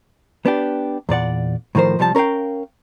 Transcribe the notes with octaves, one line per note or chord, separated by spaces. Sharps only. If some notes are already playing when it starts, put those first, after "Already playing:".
B3 D4 G4
E2 A#2 D5 F#5
A2 D#3 F3 A#4 C5
C2 F3 G3 C#5 A5
C#4 A#4 C#5 F5 G5